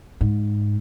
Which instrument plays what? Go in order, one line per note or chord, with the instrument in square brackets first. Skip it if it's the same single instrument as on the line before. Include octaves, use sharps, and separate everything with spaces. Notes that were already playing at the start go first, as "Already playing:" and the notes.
[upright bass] G#2